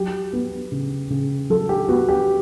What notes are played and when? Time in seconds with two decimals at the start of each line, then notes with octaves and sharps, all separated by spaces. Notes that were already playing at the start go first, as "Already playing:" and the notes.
Already playing: F#3 G4
0.33 B3
0.72 C#3
1.10 C#3
1.50 F#3 A4
1.69 G4
1.88 B3 F#4
2.09 G4